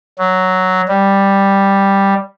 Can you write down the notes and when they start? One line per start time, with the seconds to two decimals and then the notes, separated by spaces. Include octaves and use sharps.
0.18 F#3
0.88 G3